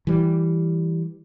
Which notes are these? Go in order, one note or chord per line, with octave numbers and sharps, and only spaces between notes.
E3 G3